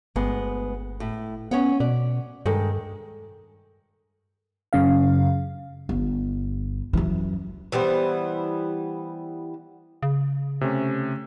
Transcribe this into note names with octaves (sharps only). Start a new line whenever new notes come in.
G1 D2 G#3 B3
A2
B3 C#4 C#5 F#5
B2 D5
G2 D#3 G#3 A4
F#2 C#3 F5
G1
F#2 E3
E3 G3 B3 C5
C#3
C3 A3 C#4